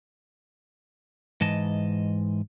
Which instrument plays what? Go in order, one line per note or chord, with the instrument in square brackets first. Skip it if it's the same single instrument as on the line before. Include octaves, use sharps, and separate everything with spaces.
[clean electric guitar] G#2 E3 D#5 A5